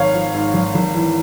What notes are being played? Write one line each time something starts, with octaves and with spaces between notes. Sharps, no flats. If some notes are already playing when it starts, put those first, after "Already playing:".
Already playing: G#1 C#5 F5
F3
G#2
G#1
G#1
E3